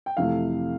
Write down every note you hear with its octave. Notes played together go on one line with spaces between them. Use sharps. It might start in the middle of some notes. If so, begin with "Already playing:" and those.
G5
F2 C3 E3 A3 F5